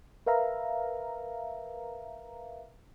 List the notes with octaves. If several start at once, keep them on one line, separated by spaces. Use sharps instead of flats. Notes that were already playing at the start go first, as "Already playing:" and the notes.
A#4 B4 E5 F5 A#5